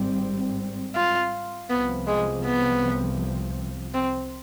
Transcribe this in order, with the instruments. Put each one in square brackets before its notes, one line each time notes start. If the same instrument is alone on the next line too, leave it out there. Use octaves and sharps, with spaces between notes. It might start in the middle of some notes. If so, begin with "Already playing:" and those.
Already playing: [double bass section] G#1 G#2 G3 C4
[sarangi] F4
[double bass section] C2 C3 F3 [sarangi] B3
[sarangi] G#3
B3
C4